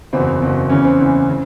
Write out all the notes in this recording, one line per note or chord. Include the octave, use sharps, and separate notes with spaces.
F#1 E2 B2 C4
F#1 E2 B2
E2 C#3 E3 C#4
C4
E2 C#3 E3
C#3